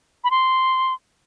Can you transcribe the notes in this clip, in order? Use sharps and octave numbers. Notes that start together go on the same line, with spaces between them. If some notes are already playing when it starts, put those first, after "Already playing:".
B5
C6